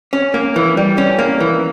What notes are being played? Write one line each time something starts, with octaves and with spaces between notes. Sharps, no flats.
C#4
A#3
E3
G3
C#4
A#3
E3